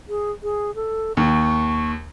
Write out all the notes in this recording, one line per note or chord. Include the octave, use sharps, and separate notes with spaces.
G#4
G#4
A4
D#2 C#6